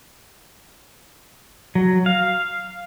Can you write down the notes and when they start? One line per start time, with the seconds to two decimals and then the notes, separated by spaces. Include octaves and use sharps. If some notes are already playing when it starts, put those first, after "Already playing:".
1.75 F#3
2.06 F5